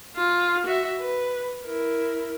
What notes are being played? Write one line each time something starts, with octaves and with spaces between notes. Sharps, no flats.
F4
F#4 E5
B4
E4 A#4